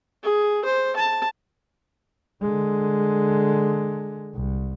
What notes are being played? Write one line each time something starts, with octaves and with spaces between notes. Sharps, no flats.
G#4
C5
A5
D3 G#3
C2